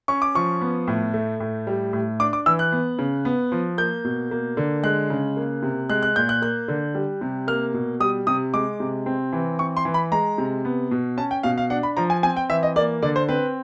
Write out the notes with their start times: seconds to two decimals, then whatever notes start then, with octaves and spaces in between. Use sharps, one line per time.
0.08 C#4 C#6
0.22 D6
0.35 F3 C#6
0.61 B3
0.88 A2
1.14 A3
1.40 A2
1.67 G3
1.93 A2
2.20 D4 D6
2.33 D6
2.46 E3 E6
2.59 F#6
2.72 B3
2.99 C#3
3.25 B3
3.52 F3
3.78 A#3 G6
4.05 B2
4.31 A#3
4.57 D3
4.83 G#3 F#6
5.10 C#3
5.37 A#3
5.63 C3
5.89 G#3 F#6
6.03 F#6
6.16 A#2 G6
6.29 F#6
6.42 A#3 F#6
6.68 D3
6.95 G3
7.21 C3
7.48 A#3 F6
7.74 B2
8.00 G3 D#6
8.27 C3 D#6
8.54 G#3 D6
8.80 C3
9.06 C4
9.33 E3
9.59 C4 C#6
9.77 C6
9.85 E3
9.94 B5
10.12 G#3 A#5
10.38 C3
10.65 B3
10.91 B2
11.17 C#4 A5
11.31 G5
11.43 B2 F5
11.58 F5
11.70 D4 F#5
11.83 B5
11.97 F3 A#5
12.10 G#5
12.23 C4 G#5
12.36 G5
12.49 E3 E5
12.63 D#5
12.76 A#3 D5
13.02 D3 D5
13.16 C5
13.29 C4 B4